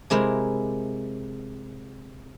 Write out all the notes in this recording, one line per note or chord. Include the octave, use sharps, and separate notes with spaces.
C3 G#3 E4 A#4 C5